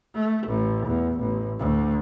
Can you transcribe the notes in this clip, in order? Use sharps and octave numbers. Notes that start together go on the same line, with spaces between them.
A3
A1
E2
A1
D2